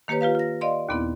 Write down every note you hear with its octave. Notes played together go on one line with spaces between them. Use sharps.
D#3 A#3 G4 B4 C#5
F4 G4 B4 F5
F4 A#6
D5 D#5 F5 C6
D#2 A#2 B3 C4 E4